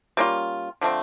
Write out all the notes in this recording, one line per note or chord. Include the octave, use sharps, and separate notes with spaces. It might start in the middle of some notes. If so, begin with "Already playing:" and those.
G3 A#3 C#4 F4
D3 F3 A3 C4